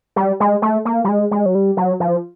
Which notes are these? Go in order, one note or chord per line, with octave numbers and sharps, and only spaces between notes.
G3
G#3
A3
A#3
G3
G#3
G#3
F#3
G3
F#3
F3